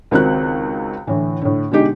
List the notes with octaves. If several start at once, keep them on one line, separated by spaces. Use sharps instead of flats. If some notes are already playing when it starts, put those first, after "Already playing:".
C#2 D#3 C4 F#4 F#6
A2 D3 E3
A2 D3
B2 D3 G#3 D#4 G4